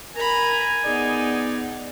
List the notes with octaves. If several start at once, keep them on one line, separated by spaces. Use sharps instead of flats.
A#4 G#5 A#5 B5
B3 D#4 G#4 D5